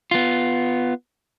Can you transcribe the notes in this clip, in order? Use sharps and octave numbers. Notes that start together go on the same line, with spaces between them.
B3 F4